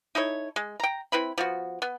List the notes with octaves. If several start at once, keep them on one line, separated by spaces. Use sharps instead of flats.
D#4 E4 A4 C#5
G#3
G5 A#5
C4 E4 B4 B5
F3 B3 F#4
B3